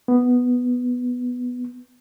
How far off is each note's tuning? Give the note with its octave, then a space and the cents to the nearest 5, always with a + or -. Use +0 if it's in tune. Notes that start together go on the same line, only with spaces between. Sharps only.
B3 +0